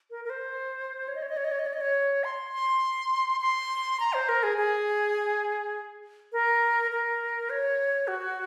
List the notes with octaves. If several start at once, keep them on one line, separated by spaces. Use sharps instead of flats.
A#4
A#4
C5
C#5
D#5
C#5
D#5
C#5
D#5
C#5
D#5
C#5
D#5
C#5
C6
C6
C6
A#5
C5
A#4
G#4
G#4
A#4
A#4
C#5
F#4